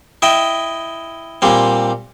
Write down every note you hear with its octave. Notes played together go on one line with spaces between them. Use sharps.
E4 D#5 E5 G5
A#2 G3 C4